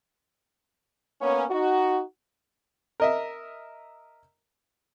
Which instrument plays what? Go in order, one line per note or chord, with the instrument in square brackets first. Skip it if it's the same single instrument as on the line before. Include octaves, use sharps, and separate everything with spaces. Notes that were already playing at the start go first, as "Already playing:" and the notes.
[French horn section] A#3 B3 C#4
D#4 F#4
[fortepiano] A#4 D#5 E5